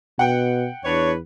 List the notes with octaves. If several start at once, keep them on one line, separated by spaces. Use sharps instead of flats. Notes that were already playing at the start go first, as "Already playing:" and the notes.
B2 F#5 G5
E2 D4 B4 C#5